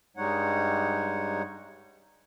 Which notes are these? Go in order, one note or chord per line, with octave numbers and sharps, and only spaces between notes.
G2 G3 G#3 D#4 C#5 F#5